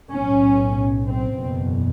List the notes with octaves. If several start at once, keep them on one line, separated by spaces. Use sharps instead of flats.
B1 A2 C#4
C4
F#1 E2 B2